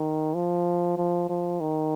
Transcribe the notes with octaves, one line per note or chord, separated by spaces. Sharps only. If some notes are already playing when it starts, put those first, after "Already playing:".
Already playing: D#3
F3
F3
F3
D#3